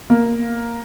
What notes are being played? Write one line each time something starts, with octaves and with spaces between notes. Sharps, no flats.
A#3